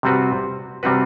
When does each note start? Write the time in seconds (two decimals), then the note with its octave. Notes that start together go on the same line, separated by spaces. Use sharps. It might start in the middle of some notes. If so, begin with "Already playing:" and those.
0.03 C3 G3 C4 F#4 B4
0.83 C3 G3 C4 F#4 B4